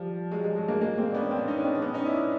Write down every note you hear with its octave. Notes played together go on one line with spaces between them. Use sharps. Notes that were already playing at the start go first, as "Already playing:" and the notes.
Already playing: F3 G3
F#3 G#3
F#3 G#3
F#3 G#3
G#3 A#3
G#3 A#3
A#3 C4
D4
B3 C#4
C4 D4
D4
C#4 D#4
C#4
C4 D4
D4
B3 C#4
C#4 D#4
D4 E4